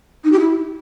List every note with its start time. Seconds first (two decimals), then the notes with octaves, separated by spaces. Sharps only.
0.24 D#4
0.32 G4
0.40 E4